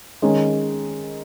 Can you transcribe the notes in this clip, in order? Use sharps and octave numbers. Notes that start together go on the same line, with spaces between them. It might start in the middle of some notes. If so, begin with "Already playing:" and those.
D#3 G#3 C#4